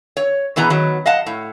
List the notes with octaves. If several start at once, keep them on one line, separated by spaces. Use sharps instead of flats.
C#5
B2 E3 B3 G#4 A#5
D#3 F#3 B3
D#5 F5 F#5 A5
A2